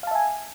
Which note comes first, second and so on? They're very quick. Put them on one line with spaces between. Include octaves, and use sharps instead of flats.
F5 A5 E5 G#5